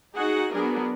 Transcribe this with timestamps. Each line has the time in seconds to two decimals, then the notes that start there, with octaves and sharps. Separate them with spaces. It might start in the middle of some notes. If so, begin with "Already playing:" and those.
0.15 D#4 F#4 G#4 F#5
0.53 F#3 B3 D4 G#4 A#4